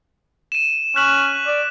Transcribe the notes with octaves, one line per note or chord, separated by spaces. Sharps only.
D#7 E7
C#4 F#6 B6 F#7
D5